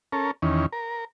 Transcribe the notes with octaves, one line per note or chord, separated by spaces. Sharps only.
C#4 A4 A#4
E2 D#3 C#4
A#4